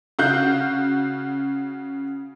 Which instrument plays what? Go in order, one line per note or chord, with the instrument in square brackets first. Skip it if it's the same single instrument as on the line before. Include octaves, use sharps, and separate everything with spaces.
[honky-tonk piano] C#3 F#4 F5 F#6 G6